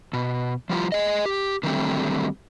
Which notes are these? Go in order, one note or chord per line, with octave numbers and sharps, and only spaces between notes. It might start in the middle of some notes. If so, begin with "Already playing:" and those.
B2
F3 G3 F4
G#4 D#5
G4
D3 D#3 F#3 G3 A3 C4